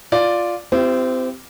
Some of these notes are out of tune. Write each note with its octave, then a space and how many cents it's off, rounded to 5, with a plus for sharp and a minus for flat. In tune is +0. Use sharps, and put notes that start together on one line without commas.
F4 +0 D5 +0
C4 -25 E4 +40 G4 +0